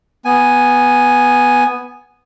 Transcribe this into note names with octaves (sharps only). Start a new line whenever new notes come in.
B3 G#5